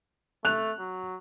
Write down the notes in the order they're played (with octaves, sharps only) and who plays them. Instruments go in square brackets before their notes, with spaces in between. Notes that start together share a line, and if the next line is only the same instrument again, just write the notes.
[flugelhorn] A3 [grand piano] F#6 F7
[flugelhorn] F#3